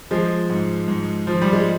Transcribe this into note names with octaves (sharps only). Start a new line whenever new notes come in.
F3 G#3
G#2
G#2
F3
G3
G#3